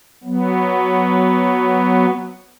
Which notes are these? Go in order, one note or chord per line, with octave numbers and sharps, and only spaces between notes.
F#3 B3